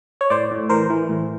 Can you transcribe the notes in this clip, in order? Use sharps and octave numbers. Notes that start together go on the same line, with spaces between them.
C#5
A2 C5 D5
A2
E3 A#4 C5
E3
A2